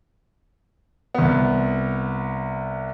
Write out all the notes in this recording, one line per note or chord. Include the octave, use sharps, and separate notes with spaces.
C2 B3